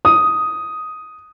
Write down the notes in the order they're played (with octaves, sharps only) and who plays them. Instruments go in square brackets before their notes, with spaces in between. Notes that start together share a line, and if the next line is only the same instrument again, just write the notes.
[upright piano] D#6